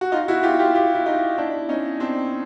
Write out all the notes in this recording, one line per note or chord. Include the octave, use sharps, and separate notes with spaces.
F#4
D#4 F4
E4 F#4
F4 G4
F4 G4
F4 G4
E4
D#4 F4
D4 E4
C#4 D#4
C4 D4